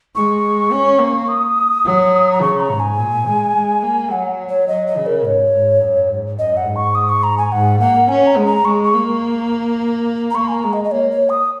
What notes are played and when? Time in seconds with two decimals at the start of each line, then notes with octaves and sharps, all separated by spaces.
0.15 G#3 C#6
0.72 C#4
1.00 A#3
1.29 D#6
1.86 F#3
2.32 A#5
2.41 C#3 C#6
2.60 A#5
2.71 G#2
2.80 G#5
2.98 A#2
3.27 G#3
3.55 G#3
3.83 A#3
4.11 F#3 F#5
4.49 C#5
4.68 F#3 D#5
4.87 D#5
4.97 C#3
5.06 A#4
5.24 G#2 C#5
5.54 G#2
5.81 F#2
6.11 G#2
6.38 F#2 D#5
6.57 F#5
6.66 G#2
6.76 C#6
6.95 D#6
7.09 C#6
7.23 A#5
7.38 G#5
7.52 G#2 F#5
7.80 A#3 F#5
8.09 C#4 G#5
8.27 A#5
8.37 G#3
8.46 A#5
8.64 G#3 C#6
8.83 C#6
8.94 A#3
10.31 A#5
10.35 A#3 C#6
10.48 G#5
10.54 A#5
10.64 G#3
10.73 D#5
10.84 D#5
10.92 A#3 C#5
11.11 C#5
11.29 D#6